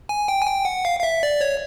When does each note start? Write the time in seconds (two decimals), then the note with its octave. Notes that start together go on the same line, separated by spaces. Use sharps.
0.09 G#5
0.28 G5
0.42 G#5
0.47 G5
0.65 F#5
0.85 F5
0.99 F5
1.03 E5
1.23 D5
1.41 C#5